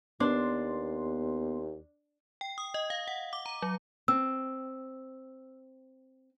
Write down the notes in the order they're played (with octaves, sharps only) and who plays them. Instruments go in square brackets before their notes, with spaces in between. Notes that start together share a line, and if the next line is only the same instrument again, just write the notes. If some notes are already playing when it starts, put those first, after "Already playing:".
[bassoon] D#2 [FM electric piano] B3 C6 [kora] D4
[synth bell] G5
D#6
D#5
F5
F#5
D6
A#5
F#3
[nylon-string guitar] C4 [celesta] E6